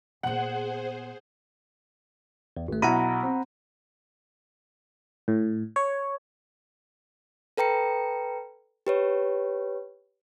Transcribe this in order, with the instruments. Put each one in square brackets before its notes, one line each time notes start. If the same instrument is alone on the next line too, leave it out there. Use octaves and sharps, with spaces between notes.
[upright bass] A#2 B3 [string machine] G#4 C5 [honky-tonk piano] F#5
[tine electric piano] E2
G#1 A3
[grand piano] B1 E4 D#7 [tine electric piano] F#5 A#5 B5
[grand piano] C4
[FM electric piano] A2
C#5
[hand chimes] A4 B4 G5 A#5 C#7
G4 B4 C#5